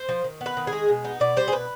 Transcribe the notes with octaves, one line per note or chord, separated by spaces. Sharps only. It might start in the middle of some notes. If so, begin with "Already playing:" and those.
Already playing: C5
F3
D#3
B3
B4
D#3
G#4
G#3
B2
B3 D#4
B2 D5
G3 C5
G#4
B2 B4